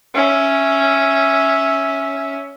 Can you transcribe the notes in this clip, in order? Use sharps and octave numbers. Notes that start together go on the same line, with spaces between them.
C#4 E5